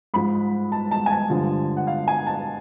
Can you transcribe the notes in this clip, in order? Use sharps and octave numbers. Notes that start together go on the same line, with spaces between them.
G#2 F3 B5
A5
A5
G#5
A5
G2 D3 F3
F#5
F5
G#5
A5